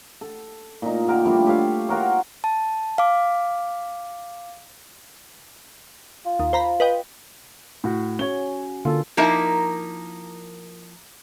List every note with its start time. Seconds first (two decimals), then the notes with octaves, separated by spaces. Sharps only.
0.21 A4
0.82 A#2 D#4
1.07 D3 A#4 G5
1.26 F3 G3 A3 D4
1.46 G4 A4 C#5 F5
1.89 F4 F#4 A#4 C#5
2.44 A5
2.98 F5 D6
6.26 F4
6.40 D#2
6.53 C5 A#5 B5
6.80 B4 D#5 G5
7.84 A2 F#4
8.19 C#4 F#4 C#5 G7
8.85 D3 A#3 F4 A4
9.17 F3 A#3 D#4 E4 A#4